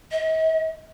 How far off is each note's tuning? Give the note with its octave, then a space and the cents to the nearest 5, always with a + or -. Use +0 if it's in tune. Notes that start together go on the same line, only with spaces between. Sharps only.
D#5 +45